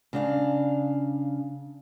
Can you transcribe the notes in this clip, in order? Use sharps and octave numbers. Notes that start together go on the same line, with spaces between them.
C#3 D4 F5